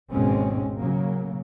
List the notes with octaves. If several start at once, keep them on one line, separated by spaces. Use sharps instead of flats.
G#1 D#2 B2 G#3 C4 C#4
C#3 F#3 A#3